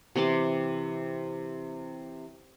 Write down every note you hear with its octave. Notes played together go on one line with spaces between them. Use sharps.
C3 E3 C6 D6